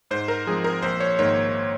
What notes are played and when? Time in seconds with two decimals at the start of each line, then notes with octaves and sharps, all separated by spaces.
0.11 G#2 C5
0.28 A#4
0.47 F3 G#3 C4 G#4
0.64 A#4
0.83 A#1 C5
1.00 C#5
1.19 G#2 D#3 A#3 C#5